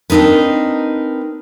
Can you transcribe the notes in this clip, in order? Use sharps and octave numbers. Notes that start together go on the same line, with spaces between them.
C4 D4 D#4 A#4 B4